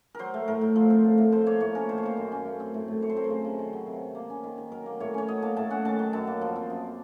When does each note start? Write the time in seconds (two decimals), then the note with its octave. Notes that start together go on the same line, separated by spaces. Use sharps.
0.15 F#3 A#4 C5
0.34 A3
0.48 A2 A#4
0.61 A2
0.76 F3
0.90 C4
1.04 A2
1.18 A2
1.32 F3 C5
1.46 A#3 C#5
1.60 A2 C#5
1.75 C#4 A#4
1.89 D#3 C5
1.98 C#5
2.03 A#3 C5
2.17 F#2
2.32 C#4
2.45 A3
2.60 C4
2.74 A2
2.88 A2
3.02 A3 C#5
3.10 C5
3.17 C4 A#4
3.24 C5
3.30 C#3
3.45 C#3
3.59 D#3
3.73 F#3
3.87 C3
4.02 C3
4.15 A#3
4.30 C#4
4.44 D#3
4.58 D#3
4.72 F#3 A#4
4.86 A#3
5.00 A2 C#5
5.14 C#4 C#5
5.28 F#3 D#5
5.42 A#3 A5
5.57 A2 A5
5.70 C#4 F#5
5.85 D#3 A5
5.99 F#3
6.13 F#2 A5
6.27 A#3
6.41 F3
6.56 C4
6.70 F#2